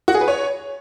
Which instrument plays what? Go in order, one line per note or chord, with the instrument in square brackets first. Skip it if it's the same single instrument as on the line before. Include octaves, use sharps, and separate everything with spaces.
[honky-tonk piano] F#4
G#4
B4
C#5